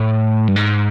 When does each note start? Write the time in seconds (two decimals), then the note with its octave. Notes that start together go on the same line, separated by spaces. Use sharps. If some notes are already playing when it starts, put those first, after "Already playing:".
Already playing: A2
0.48 G2
0.56 G#2